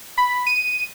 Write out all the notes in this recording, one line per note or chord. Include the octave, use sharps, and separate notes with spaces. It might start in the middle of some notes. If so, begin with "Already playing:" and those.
B5
D#7